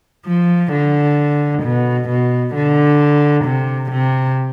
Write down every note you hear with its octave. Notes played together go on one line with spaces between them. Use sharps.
F3
D3
B2
B2
D3
C3
C3